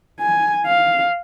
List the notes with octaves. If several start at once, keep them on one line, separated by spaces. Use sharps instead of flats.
G#5
F5